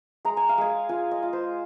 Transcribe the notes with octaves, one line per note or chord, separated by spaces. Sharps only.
G#3 A#5
G#5
F5
G#3 G#5
F4 G#5
D#5
F4
C5